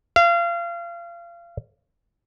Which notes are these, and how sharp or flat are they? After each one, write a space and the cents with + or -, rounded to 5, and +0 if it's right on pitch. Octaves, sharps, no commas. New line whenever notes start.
F5 -30